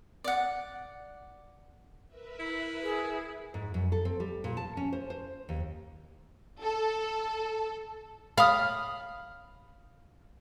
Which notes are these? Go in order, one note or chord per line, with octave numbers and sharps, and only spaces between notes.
D5 F#5
A#4 B4 E5
E4
G#4
G#2
F#2
A4
C4
G3
A#2
A5
C#4
C5
C5
D#2
A4
F5 B5 D#6